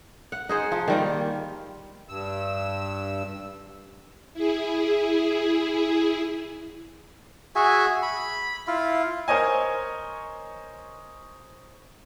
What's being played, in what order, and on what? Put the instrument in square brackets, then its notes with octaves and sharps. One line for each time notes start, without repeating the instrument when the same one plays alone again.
[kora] F#5
D#4 G#4 C5
F3
D#3 G3 A#3
[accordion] G2 E6
[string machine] E4 G#4
[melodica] F#4 G#4 E5 G#5
B5
E4 F4
[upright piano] A#4 C5 C#5 D#5 G#5